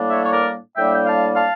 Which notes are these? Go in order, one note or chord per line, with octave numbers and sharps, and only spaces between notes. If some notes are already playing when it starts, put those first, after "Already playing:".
Already playing: A2 G3 A#3 D4
C#5 E5
C#5
A#4 D5
A2 G3 A#3 D4 E5 G5
G5
F5 A5
F5 A5